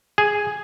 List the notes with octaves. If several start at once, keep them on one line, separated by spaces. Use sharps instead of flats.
G#4